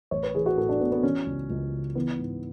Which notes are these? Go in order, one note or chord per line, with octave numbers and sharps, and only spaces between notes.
A1 C#5
B4
E3 G#4
F#4
A2 A4
D4
A2 B3
B3
E3 C#4
C#2
C#2
C#3
E3 B3
G#2